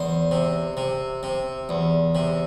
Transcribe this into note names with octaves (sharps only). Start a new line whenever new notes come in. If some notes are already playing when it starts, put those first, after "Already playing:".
Already playing: E2 C5
C3
C3
C3
E2
C3